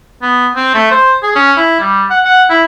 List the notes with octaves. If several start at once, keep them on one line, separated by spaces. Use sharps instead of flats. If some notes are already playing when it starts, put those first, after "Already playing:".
B3
C4
A3
C5
G#4
C#4
E4
G3
F#5
F#5
E4